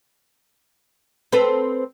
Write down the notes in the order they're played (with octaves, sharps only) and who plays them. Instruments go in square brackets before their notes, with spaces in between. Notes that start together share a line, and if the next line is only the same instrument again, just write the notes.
[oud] C4 A4 B4